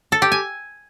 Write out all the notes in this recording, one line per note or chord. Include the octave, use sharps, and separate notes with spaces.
A4
G4
G#5